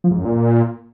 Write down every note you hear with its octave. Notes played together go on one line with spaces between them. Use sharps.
F3
G#2
F#2
A#2